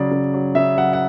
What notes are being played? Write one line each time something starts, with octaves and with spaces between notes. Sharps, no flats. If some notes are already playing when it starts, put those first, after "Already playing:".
Already playing: C#3 F#3 D5
C#3
F#3
C#3 E5
F#3 F#5
F#5